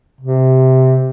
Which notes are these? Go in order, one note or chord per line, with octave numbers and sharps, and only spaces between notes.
C3